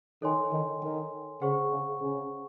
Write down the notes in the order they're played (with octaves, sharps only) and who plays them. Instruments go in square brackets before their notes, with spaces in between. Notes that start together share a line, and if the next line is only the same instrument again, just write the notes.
[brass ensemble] D#3 [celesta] A4 C#5 G#5 C6
[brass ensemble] D#3
D#3
[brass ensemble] C#3 [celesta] G#4 C5 F#5 C#6
[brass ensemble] C#3
C#3